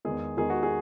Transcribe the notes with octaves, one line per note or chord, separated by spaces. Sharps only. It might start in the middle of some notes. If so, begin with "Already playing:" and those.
E2 D#3 G#3 G#4
E2 D#3 G#3 G#4
F#4
G#4